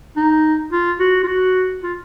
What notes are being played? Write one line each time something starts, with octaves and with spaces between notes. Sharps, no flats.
D#4
F4
F#4
F4
F#4
F4